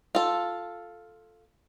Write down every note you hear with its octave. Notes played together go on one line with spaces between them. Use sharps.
F4 A4